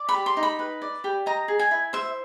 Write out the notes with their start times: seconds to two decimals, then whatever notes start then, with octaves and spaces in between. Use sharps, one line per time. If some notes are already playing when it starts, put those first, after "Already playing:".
Already playing: D5
0.09 B5
0.14 G4
0.26 C6
0.37 D#4
0.43 B5
0.59 B4
0.82 D5
1.04 G4
1.26 D#5 A#5
1.48 G#4
1.59 G#5
1.71 E4
1.93 C5 E5